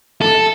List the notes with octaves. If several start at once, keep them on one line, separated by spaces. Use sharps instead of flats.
A4